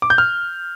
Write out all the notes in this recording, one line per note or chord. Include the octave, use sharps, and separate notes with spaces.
D6
G6
F6